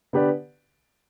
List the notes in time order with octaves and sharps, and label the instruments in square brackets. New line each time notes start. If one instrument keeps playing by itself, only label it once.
[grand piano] D3 B3 G4 B4 D5